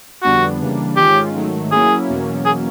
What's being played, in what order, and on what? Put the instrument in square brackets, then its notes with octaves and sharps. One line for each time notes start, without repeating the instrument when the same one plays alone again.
[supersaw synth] F2 D3 G3 B3 D4 [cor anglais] F#4
[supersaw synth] C#3 E3 G3 A#3 D4
[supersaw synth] G#2 D#3 G#3 C#4 F4 [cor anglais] G4
[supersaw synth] G#2 D#3 F#3 A3
[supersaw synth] F#3 A#3 C#4 E4 [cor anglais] G#4
[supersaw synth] E2 B2 F#3 A#3 C#4
[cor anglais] G#4